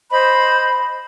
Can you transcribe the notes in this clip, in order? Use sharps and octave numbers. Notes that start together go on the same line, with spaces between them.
C5 D#5 B5